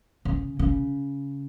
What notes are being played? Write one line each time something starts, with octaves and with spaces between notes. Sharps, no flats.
C#3
C#3